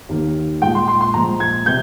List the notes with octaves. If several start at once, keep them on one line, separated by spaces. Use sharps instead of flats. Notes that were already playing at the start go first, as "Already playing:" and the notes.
D#2 D#3 A#3
A#2 G#3 G5
C6
C6
C6
A#2 F3 G#3 A#5
G#6
C3 G3 G6